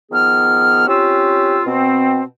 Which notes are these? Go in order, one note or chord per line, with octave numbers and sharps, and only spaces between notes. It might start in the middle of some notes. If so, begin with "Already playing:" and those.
D#3 F3 B3 G#4 F6
C4 C#4 F4 G4 E6
B2 C4